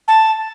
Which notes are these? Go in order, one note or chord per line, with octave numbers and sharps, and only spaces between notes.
A5